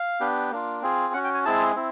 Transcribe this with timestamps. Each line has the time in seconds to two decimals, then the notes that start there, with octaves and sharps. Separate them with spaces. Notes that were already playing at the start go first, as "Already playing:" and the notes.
Already playing: F5
0.21 B3 D4 G4
0.52 A#3 D4 F4
0.83 C4 F4 G#4
1.14 C#4 F#4 F#5
1.24 G5
1.34 G#5
1.45 G#3 C4 E4 G#4 A5
1.76 C4 E4